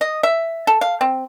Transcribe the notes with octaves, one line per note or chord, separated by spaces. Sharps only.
D#5
E5
A4
F5
C4